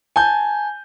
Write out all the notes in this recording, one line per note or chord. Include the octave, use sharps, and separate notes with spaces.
G#5 A5 G6